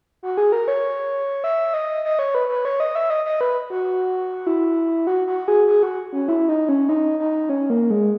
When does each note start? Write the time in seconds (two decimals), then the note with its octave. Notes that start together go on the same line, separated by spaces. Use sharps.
0.23 F#4
0.37 G#4
0.52 A#4
0.68 C#5
1.44 E5
1.74 D#5
2.05 D#5
2.19 C#5
2.35 B4
2.49 B4
2.65 C#5
2.80 D#5
2.95 E5
3.10 D#5
3.25 D#5
3.41 B4
3.70 F#4
4.47 E4
5.07 F#4
5.27 F#4
5.48 G#4
5.67 G#4
5.83 F#4
6.13 C#4
6.29 E4
6.49 D#4
6.69 C#4
6.89 D#4
7.19 D#4
7.49 C#4
7.70 A#3
7.90 G#3